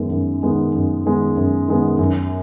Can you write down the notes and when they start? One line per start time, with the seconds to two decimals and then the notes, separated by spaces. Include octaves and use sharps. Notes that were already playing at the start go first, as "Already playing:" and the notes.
Already playing: F#2 D#3 G#3 B3
0.12 F#2
0.43 D#3 G#3 B3
0.75 F#2
1.06 D#3 G#3 B3
1.37 F#2
1.68 D#3 G#3 B3
1.99 F#2